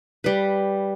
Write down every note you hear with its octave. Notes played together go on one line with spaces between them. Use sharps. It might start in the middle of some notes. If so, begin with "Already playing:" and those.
G3 B4